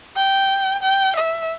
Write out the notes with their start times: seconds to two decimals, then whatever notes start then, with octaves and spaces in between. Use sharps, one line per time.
0.16 G5
0.83 G5
1.16 E5